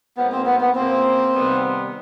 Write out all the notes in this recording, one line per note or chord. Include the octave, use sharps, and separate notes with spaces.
G#2 F3 A#3 B3
C4
B3
B3
C#3 F3 A#3 C4
C3 D#3 G3 B3